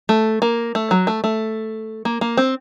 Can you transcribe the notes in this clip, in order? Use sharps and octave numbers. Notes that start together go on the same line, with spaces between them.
A3
A#3
A3
F#3
A3
A3
A#3
A#3
C4